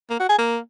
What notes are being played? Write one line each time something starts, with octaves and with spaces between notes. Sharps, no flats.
A#3
F#4
G#4
A#3